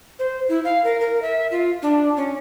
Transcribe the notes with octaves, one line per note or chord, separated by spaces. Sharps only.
C5
E4
F5
A#4
A#4
E5
F4
D4
C#4